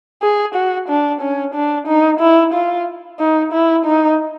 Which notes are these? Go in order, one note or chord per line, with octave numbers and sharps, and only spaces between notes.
G#4
F#4
D4
C#4
D4
D#4
E4
F4
D#4
E4
D#4